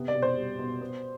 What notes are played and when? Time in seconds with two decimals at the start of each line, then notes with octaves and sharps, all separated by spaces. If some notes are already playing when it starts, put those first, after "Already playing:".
Already playing: C3 B3
0.08 D5
0.15 B2
0.22 C5
0.37 G3
0.59 B2
0.81 B3